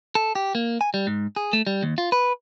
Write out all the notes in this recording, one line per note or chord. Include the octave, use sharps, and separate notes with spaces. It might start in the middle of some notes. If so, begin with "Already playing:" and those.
A4
G4
A#3
G#5
G3
G#2
G#4
A3
G3
D#2
F4
B4